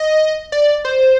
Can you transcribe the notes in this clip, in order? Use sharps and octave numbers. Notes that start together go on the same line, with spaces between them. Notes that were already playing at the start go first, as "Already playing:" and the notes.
Already playing: D#5
D5
C5